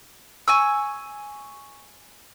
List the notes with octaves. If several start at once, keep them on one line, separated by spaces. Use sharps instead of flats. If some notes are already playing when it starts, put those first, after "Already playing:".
G#5 C#6 E6